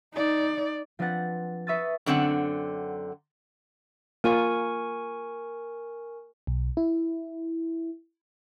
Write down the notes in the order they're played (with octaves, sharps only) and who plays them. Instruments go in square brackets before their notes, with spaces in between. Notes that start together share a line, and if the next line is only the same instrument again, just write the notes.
[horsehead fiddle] D#4 D5
[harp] F3 C4 D4 B4 F#5 A6
B4 E5 C#6 D#6 E6 A6
[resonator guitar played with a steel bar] F#2 D3 C4 F#5
[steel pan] A#3 F4 [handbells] A#4 G#5 C#6
[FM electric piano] B1
E4